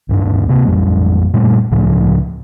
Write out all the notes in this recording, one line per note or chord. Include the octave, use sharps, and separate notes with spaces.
D1 G2 D4
C3 A#3
A1 F2 G3
A#2 G3 A3
C#2 A2 C#3 F3